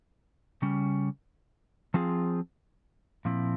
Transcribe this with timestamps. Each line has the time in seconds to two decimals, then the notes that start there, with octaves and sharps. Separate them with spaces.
0.62 C#3 G3 C#4
1.94 F3 C4 F4 G#4
3.25 A#2 F3 C4 E4